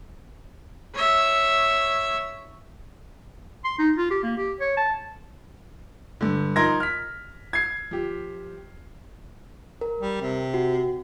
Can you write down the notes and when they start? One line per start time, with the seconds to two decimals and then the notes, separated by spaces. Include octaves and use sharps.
0.94 C#5 E5
3.65 C6
3.79 D#4
3.96 F4
4.10 G4
4.23 A#3
4.38 G4
4.60 C#5
4.77 A5
6.21 G2 D3
6.56 F3 D#4 A#4 C6 G#6 A#6
6.80 F6 B6
7.53 G#6 C7
7.91 F3 G4
9.81 A#4
10.00 G3
10.21 C3
10.54 F#4